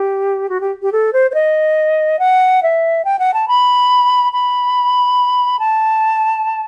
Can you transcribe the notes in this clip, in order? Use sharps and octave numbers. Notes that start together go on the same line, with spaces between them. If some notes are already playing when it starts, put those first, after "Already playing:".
Already playing: G4
F#4
G4
G4
A4
C5
C5
D#5
F#5
E5
G5
F#5
A5
B5
B5
A5